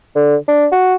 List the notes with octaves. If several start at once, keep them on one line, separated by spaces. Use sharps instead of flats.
D3
D4
F#4